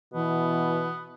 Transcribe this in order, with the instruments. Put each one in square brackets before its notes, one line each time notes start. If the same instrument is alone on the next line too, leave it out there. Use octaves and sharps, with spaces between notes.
[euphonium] B2 [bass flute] E3 [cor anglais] B3